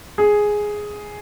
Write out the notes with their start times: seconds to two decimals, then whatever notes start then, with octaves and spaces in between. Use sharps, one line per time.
0.18 G#4